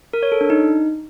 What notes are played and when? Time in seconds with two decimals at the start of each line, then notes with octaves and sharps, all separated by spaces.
0.13 A#4
0.23 C#5
0.32 A4
0.41 D4
0.50 D#4